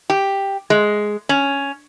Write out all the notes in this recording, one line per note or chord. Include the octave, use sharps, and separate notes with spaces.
G4
G#3
C#4